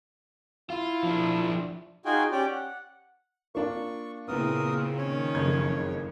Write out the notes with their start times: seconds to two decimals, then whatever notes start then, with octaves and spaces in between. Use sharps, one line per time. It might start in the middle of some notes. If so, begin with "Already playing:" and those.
0.70 E4 F4
1.03 F3 D4
2.05 D#4 F4 F#4 G#4 G5 G#5
2.32 C#4 G4 D5 G5
2.51 F#5
3.55 A#3 D4 F4 C#6
4.28 A#2 C#3 B3 C4 E4 A#4 D#6
4.98 D#3 C#4 C#5
5.35 F#1 F2 C#3 G#6